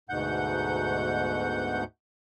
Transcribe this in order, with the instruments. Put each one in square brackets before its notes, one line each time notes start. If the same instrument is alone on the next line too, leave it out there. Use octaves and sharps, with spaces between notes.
[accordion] D2 G#2 B2 F#5 G6